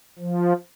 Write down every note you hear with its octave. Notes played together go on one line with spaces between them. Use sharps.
F3